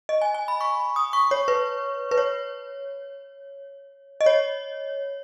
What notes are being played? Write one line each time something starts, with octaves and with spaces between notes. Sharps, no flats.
D#5
G#5
G#5
B5
C#6
D#6
C#6
C#5
B4
B4
C#5
D#5
C#5